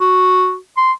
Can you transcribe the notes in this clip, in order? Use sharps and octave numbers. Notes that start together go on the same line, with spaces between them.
F#4
C6